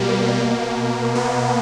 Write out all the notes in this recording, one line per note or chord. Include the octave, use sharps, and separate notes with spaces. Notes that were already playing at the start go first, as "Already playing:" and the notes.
Already playing: B2 G3 A#3
B2
B3